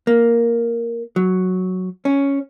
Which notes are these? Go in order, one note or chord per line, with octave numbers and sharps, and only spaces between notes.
A#3
F#3
C#4